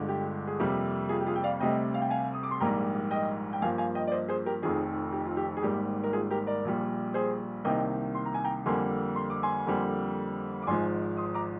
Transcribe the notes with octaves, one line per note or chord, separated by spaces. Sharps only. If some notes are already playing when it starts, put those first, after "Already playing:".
Already playing: G1 G2 D3 G#3
G4
G#4
F2 C3 G3 A#3 G4
F4 G#4
G4
F4 G#4
G5
D5 F5
D2 C3 G3 D#5 G5
F5
G5
F5 G#5
D#6
D6
C6
A#1 G#2 G3 A#3 G5 A#5
D#5 G5
G5
G2 F3 A#3 F5 G#5
F5 G#5
D#5 G5
D5
C5 D#5
G#4 C5
G4 A#4
F1 F2 D#3 F4 G#4
G4
F4
G4
G#4
G#1 G#2 G3 A#3 G4
A#4
F4 G#4
G4 A#4
A#4 D5
A#1 A#2 G3
G#4 C5
C2 C3 D#3 A#3 D#5 G5
C6
A#5
G#5
G5 A#5
F2 D3 G3 A#3 G#5 C6
C6
D6
G#5 C6
F2 D3 G3 A#3
D6
G#1 G#2 F3 G#3 G#5 C6
C6 D#6
A#5 D6